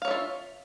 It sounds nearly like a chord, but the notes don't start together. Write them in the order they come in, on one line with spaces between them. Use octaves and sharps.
F5 C#5 E5 F4